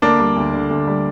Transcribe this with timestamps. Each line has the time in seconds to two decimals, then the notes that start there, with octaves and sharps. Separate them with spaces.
0.02 D2 A#3 D4
0.19 G3
0.36 D2
0.53 D3
0.70 D2
0.88 G3